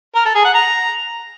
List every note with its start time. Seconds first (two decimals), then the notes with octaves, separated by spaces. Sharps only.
0.15 A#4
0.25 A4
0.35 G#4
0.45 F#5
0.54 A#5